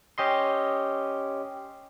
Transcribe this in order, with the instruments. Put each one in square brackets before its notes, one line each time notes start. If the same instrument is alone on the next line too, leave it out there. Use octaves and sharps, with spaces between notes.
[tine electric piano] C#4 G4 D#5 C6